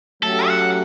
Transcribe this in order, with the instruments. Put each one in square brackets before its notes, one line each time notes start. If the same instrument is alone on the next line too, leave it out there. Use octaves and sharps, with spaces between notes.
[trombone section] F#3 A3 C#4 G4 [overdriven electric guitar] A4
[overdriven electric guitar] F#5